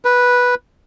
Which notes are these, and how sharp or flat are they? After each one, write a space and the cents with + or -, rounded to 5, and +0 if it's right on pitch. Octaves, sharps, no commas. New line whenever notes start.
B4 -10